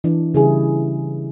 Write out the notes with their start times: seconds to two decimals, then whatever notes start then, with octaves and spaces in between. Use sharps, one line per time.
0.04 E3 D4
0.34 C#3 G3 C#4 E4 G4 G#4